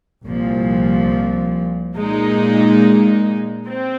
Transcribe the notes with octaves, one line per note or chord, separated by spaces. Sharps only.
C2 A#2 F3
A#2 G#3 D#4
C4